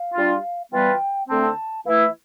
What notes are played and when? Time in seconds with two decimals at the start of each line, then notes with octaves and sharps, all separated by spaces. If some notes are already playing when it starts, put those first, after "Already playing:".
Already playing: F5
0.14 G3 D4 F4
0.71 E3 G3 B3 F4 B4 G5
1.28 D3 A3 C4 A5
1.42 A5
1.85 E3 A3 E4 E5 F5